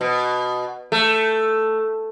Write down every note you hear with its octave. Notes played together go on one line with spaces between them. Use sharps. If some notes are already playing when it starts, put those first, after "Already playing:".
B2
A3